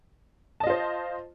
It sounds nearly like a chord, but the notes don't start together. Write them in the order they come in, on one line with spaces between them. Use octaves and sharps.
A5 D#5 F4 C5